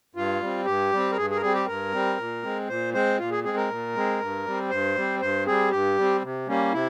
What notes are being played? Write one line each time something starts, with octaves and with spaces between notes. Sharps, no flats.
G2 F4
G3 C4
G2 G4
G3 C4
A#4
G2 G#4
G#4
A#4
G3 C4 G#4
G4
G2 A#4
G3 C4
A#2
G#3 C4
A#2 C5
G#3 C4 C5
A#2 F4
G#4
G#3 C4 G#4
A#4
A#2
G#3 C4
G2
G3 C4
G2 C5
G3 C4
G2 C5
G3 C4 G#4
G2 G4
G3 C4
C3
G3 A#3 C#4
C3 E4